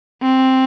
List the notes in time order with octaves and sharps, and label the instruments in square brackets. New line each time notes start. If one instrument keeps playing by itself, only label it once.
[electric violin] C4